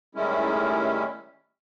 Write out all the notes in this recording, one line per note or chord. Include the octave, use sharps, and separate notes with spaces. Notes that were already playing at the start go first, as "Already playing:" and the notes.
A2 D#3 G3 G#3 C#4 E4